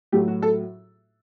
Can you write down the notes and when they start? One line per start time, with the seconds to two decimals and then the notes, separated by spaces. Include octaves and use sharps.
0.12 A2 F#3 A3 G4
0.28 F#4
0.42 A4